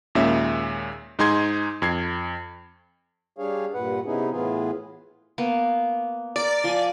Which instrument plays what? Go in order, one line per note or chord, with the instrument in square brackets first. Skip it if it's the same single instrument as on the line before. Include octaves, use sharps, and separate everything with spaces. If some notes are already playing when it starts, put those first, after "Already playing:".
[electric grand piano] D#2 A#2 G#3 C#4 E5
G#2 D#4 G#4 C6 G#6
F2 G#6 C7
[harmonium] G3 D4 G#4 C#5 F5
G2 A#2 B4 F#5
C3 B3 C#4 D#4 E4 G#4
A2 E3 B3 F4 G#4
[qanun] A#3 B3
[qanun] A#4 [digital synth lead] D5
[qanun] F3 G#5